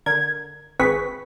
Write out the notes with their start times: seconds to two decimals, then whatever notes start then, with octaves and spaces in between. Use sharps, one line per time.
0.06 D3 A#4 G#6
0.80 G#1 C4 G#4 B4 C#6 B6